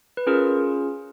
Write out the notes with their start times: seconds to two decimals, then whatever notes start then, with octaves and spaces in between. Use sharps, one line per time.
0.17 B4
0.27 C#4 F4 G#4 A#4